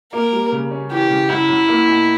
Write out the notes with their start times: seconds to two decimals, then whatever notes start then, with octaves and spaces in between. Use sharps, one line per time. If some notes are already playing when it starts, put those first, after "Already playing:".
0.13 A#3 A#4
0.32 G3
0.52 C#3
0.71 C#4
0.91 E3 G4
1.10 C#3
1.29 F#2 E4
1.49 F#2
1.68 A#3
1.88 B2